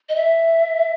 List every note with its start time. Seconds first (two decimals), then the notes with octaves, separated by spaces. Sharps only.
0.09 D#5
0.16 E5